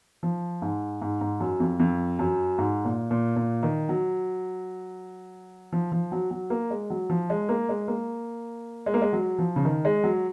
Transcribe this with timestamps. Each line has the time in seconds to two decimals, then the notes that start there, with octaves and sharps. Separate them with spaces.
0.23 F3
0.62 G#2
1.02 G#2
1.21 G#2
1.40 F#2
1.60 F2
1.80 F2
2.19 F#2
2.58 G#2
2.85 A#2
3.11 A#2
3.36 A#2
3.63 D#3
3.89 F#3
5.72 F3
5.92 F3
6.12 F#3
6.31 F#3
6.50 A#3
6.70 G#3
6.90 F#3
7.10 F3
7.30 G#3
7.49 A#3
7.69 G#3
7.88 A#3
8.86 G#3
8.94 A#3
9.02 G#3
9.13 F#3
9.39 F3
9.56 C#3
9.65 D#3
9.85 G#3
10.04 F#3